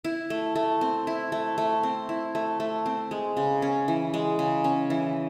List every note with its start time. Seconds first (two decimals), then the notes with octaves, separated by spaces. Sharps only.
0.04 E4
0.30 A3
0.55 A3
0.81 C4
1.07 E4
1.32 A3
1.58 A3
1.83 C4
2.09 E4
2.35 A3
2.60 A3
2.86 C4
3.11 G#3
3.37 C#3
3.62 C#4
3.88 E3
4.14 G#3
4.39 C#3
4.64 C#4
4.90 E3